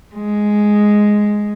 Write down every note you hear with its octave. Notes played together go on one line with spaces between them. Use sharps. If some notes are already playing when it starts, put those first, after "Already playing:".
G#3